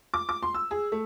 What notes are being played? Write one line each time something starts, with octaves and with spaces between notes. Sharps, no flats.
D6
D6
C6
E6
G#4
A3